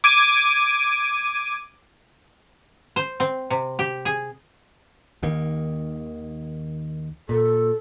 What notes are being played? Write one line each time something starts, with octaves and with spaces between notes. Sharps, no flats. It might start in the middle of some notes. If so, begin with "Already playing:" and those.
D6 G#6 D7 D#7
C5
C4
C3
G4
G#4
D#2 D#3 A#3
A#2 A4